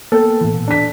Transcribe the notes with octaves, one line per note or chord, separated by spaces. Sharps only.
A#3 B3 A4 G5
A2 E3
A#2
D4 B6